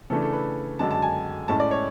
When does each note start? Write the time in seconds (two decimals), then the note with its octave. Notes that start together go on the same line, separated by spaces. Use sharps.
0.10 C#3 E3 A3 D4 A4
0.22 A4
0.33 B4
0.79 F#2 D3 G#3 D4 A5
0.91 A5
1.02 G#5
1.48 A2 G#3 C#4 A5
1.60 D5
1.71 C#5